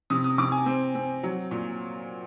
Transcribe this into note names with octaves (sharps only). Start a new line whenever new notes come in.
C3 D#6
D#6
C3 D6
G#5
C4
C4
F#3
A#2